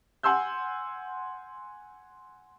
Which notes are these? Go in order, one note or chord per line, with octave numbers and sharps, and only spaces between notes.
F#5 G#5 C6 E6 G6